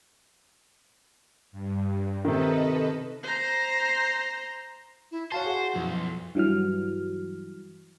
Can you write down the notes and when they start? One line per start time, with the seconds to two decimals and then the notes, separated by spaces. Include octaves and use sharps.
1.52 G2
2.25 C3 D#3 A4 B4 D#5
3.23 C5 A#5
5.11 E4
5.32 F#4 C5 C#5 F5 A5
5.46 G#4 F#5
5.75 B1 F#2 F3 E4 C6
6.35 G2 E3 F#3 F6